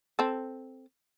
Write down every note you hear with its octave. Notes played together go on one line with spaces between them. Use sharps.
C4 A4